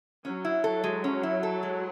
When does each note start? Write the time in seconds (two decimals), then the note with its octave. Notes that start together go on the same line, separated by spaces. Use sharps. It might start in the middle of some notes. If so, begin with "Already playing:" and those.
0.25 F#3 C#4
0.45 E4
0.64 A4
0.84 G#3
1.04 C#4
1.23 E4
1.43 A4
1.63 G#3